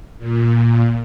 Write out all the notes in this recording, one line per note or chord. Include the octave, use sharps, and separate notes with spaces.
A#2